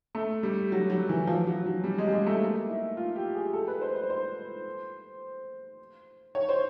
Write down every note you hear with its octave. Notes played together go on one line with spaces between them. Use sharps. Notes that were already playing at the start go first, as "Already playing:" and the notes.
A3
G3
F#3
F#3
E3
F3
F#3
F#3
G3
G#3
G3
G#3
A3
A#3
E4
F4
G4
G#4
A4
B4
C5
C5
C5
C#5
C5